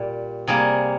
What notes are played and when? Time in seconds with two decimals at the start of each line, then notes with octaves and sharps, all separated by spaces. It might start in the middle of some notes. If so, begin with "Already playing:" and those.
Already playing: A#2 G3
0.47 C3 G3 A#3 G#4